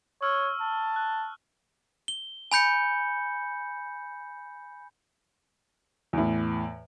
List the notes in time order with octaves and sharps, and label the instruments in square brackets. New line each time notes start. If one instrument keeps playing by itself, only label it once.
[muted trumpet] C#5 [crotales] C#6 E6 F6
[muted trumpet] A5
[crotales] F#6
[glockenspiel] G7
G#5 B5 G6 C#7
[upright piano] E2 A2